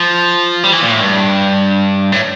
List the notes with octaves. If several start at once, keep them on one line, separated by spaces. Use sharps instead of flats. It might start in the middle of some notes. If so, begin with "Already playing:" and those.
Already playing: F3
G3
E3
A#2
A2
G2
A2